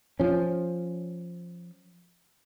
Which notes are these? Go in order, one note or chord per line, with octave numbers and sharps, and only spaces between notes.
F3 C#4